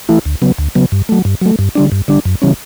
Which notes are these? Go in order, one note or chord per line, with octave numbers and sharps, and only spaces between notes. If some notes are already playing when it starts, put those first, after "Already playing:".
E3 A3 E4
D2
C#3 F#3 B3
D2
C#3 F#3 B3
G2
F#3 A3
G2
F#3 A3
G2
D3 G3 D4
G2
D3 G3 D4
F#2
C#3 E3 G3 C#4